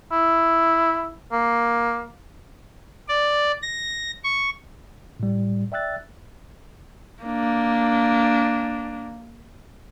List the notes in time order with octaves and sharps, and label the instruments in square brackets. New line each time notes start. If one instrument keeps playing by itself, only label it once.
[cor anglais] E4
A#3
[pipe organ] D5
A#6
C#6
[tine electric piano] A2 G3
D5 E5 G5 E6 F#6 A6
[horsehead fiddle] A#3 D4